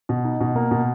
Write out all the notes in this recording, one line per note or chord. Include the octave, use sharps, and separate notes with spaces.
B2
D#4
B2
A#3
B2